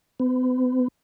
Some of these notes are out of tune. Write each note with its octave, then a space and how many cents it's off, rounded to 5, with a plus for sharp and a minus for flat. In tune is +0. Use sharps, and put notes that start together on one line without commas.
B3 +45